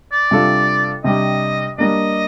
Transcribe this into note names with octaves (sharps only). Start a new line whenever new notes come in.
D5
C3 G3 D4 F4 A4
C3 G3 D4 G4 D#5
G3 A#3 D4 D#5